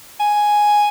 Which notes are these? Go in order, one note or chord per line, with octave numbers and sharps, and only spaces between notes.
G#5